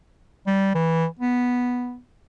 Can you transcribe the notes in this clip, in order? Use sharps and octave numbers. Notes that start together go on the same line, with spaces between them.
G3
E3
B3